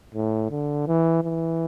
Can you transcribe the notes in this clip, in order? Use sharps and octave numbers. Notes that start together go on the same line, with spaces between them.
A2
D3
E3
E3